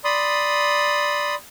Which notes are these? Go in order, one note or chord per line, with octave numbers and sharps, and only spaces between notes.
D5 B5 C6 D#6